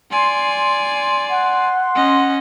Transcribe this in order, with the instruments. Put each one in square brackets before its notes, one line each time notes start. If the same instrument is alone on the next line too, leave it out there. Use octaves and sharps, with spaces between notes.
[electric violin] D5 G#5 [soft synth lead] C6
[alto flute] F#5
[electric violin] C#4 D#5